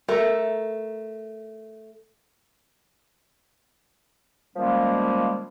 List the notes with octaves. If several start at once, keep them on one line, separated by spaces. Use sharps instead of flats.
A3 A#4
D#3 F3 G3 G#3 A#3 C#4